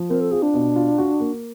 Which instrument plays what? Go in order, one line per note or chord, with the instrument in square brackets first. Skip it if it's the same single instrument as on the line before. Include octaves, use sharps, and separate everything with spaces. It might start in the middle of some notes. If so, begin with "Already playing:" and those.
Already playing: [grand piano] F3
[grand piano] C4 [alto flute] A#4
[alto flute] A4
[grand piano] F4 [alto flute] G#4
[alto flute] D4
[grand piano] B2
F4
F#4
A#3